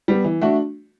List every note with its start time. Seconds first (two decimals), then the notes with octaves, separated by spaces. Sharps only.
0.08 G3 B3
0.24 E3
0.41 A3 D4 F#4